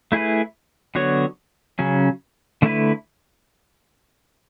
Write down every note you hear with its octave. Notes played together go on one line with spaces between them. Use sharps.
A3 E4 G#4 B4
D3 F#3 B3 F#4 C#5
C#3 F#3 C#4
D3 A3 E4 B4